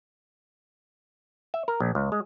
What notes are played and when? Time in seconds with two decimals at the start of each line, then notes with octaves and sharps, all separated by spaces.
1.54 E5
1.68 A#4
1.80 A#1
1.95 C#2
2.12 G#3